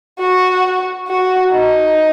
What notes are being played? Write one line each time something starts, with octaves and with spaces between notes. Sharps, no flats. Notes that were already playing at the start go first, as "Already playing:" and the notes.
F#4
F#4
D#4